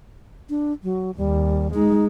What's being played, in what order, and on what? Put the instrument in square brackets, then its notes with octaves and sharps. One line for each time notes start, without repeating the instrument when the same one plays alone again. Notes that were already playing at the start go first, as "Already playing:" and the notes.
[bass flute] D4
F#3
[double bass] D#2 [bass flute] G3
[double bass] G#3 [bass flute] D#4